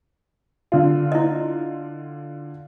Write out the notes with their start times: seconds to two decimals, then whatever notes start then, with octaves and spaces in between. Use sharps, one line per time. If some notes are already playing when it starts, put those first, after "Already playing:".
0.72 D3 F4
1.12 E4 D#5